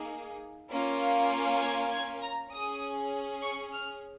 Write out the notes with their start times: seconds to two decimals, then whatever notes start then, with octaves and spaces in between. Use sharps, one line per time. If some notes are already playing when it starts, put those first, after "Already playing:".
Already playing: A#3 D#4 G#4
0.70 A#3 C#4 F4
1.61 G#6
1.91 G#6
2.22 A#5
2.51 C#4 G#4 D#6
3.42 C#6
3.73 F6